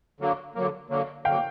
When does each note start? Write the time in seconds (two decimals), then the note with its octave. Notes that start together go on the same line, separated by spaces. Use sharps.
0.20 D3 F#3 A#3
0.55 D3 F#3 A#3
0.90 D3 F#3 A#3
1.25 D3 F#3 A#3 F5 G5